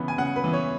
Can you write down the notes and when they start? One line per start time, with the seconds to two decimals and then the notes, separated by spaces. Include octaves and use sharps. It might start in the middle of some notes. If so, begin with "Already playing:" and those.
Already playing: C#3 E3 B3
0.08 G#5
0.18 C#3 F#5
0.36 B4
0.44 E3 B3
0.53 C#5